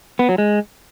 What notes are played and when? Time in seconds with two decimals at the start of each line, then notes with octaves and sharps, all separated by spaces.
0.19 B3
0.29 F#3
0.38 G#3